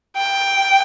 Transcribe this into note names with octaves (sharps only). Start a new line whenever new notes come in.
G5